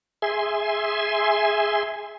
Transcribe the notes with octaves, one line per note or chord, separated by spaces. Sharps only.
G#4 E5 G#5 C6